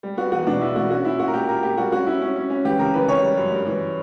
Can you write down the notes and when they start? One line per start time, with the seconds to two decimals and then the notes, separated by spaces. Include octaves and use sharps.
0.03 G3
0.17 B3 F#4
0.32 E2 F#4
0.47 B2 D4
0.61 E2 E4
0.76 B2 F#4
0.90 C#4 F#4
1.05 A#2 E4
1.19 A#2 F#4
1.28 A#4
1.34 A#2 G4
1.48 A#3 A#4
1.63 A#2 G4
1.77 G3 F#4
1.92 C#4 F#4
2.06 C#4 E4
2.22 C#4
2.36 C#4
2.50 C#4
2.65 E3 G4
2.79 C#3 A#4
2.94 E3 B4
3.08 C#3 C#5
3.23 G3
3.37 F#2
3.52 G2
3.66 E3